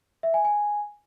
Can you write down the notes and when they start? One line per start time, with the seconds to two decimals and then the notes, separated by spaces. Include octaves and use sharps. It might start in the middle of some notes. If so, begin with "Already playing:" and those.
0.23 E5
0.34 G#5
0.45 G#5